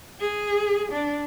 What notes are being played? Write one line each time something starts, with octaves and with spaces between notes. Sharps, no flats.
G#4
D4